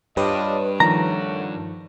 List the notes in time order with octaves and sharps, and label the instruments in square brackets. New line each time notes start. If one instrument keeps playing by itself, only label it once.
[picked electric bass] G2 [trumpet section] D4 F4 D#5 [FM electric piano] G4 B4 C#5
[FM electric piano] D#3 F3 [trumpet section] A3 C#5 F#5 [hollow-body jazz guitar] A#5